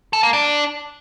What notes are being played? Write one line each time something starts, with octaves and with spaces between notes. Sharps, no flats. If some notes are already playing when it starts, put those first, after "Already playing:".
A4
A#3
D4